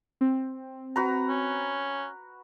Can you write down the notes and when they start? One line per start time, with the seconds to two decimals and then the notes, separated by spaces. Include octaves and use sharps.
0.21 C4
0.96 F#4 B4 A#5
1.29 C#4